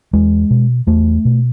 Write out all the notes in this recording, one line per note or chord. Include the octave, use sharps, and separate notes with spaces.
E2 G#3
B2
E2 A3
B2